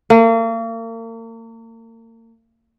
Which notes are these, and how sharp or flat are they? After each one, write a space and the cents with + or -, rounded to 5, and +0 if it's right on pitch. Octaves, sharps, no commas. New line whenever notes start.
A#3 -40